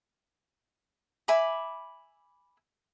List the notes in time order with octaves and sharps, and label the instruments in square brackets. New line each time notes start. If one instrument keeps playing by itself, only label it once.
[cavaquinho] E5 G#5 B5 D6